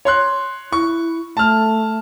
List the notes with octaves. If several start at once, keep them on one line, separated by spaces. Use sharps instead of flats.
C#5 C6 F#6
E4 C#6
A3 A5 F6